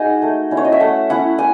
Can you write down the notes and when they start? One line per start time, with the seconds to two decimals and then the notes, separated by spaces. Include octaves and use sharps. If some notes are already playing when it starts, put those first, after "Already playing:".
Already playing: G#3 D#4 F#4 G#4 F#5 G#5
0.22 A3
0.51 C#4 E4
0.57 C#5
0.65 D#5
0.72 E5
0.80 A3 F#5
1.10 C#4 E4 F#5
1.39 G#5